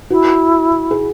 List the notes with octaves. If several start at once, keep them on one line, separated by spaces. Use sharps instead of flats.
E4 F#4
G#4